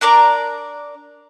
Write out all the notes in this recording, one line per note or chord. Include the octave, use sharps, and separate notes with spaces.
D4 A#4 D5 A#5